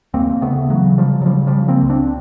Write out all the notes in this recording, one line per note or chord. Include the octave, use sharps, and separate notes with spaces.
D#2 A#3 C4
C#3 A3 B3
C#3 E3 F#3
C#3 F3 G3
F#3
C#3 F3 G3
F3 G3
C#3
A#3 C4
C#2
C4 D4